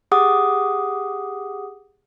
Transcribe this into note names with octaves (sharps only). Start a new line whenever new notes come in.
G4 G#4 F#5 D6 D#6